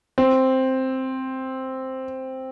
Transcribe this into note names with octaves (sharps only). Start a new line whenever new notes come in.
C4